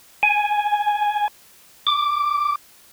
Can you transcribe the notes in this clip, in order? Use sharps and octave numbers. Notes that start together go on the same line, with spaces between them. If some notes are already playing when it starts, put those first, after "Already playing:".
G#5
D6